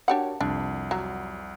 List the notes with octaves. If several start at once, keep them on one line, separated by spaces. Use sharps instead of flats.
D4 F#4 G4 A#4 C#5 F#5
C2 F2 D4
F#3